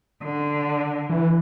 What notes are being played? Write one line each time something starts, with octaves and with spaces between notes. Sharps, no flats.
D3
E3